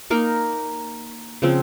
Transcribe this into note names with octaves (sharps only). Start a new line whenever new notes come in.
A#3 D#4 A#4
C#3 F3 C4